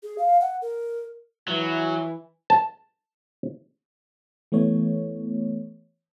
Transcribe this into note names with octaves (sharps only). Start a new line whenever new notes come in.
G#4
F5
F#5
A#4
E3 F#3
A5
E3 A3 B3 C#5